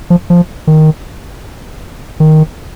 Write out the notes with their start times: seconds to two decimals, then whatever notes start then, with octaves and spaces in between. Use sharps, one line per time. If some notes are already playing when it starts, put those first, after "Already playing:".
0.10 F3
0.30 F3
0.67 D#3
2.20 D#3